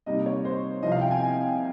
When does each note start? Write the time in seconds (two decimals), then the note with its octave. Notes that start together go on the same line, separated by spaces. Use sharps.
0.06 C3 G3 A#3 D#4 D#5
0.26 C#5
0.45 C5
0.83 C2 C3 F3 D#5
0.92 F5
1.01 G5
1.11 G#5